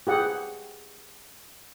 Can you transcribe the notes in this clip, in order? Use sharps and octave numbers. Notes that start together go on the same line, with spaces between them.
G4 G#4 F#5